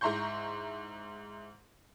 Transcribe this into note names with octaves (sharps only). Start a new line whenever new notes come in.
G#2 E4 A#5 C6 C#6 G6